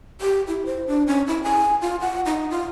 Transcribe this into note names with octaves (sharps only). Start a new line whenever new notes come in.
G4
E4
C5
D4
C#4
E4
G#5
F4
F#5
D#4
F4